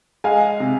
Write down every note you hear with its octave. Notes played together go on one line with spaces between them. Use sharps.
G#3 F5 G#5
C3